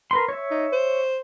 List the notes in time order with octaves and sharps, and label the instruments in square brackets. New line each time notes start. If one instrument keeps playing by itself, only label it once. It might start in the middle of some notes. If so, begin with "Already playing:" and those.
[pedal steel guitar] A#4 B4 C6
C#5 E5
[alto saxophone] D#4
C5